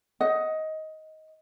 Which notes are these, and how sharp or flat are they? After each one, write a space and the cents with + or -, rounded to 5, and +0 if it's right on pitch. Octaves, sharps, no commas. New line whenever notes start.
D#5 +15 F#5 +0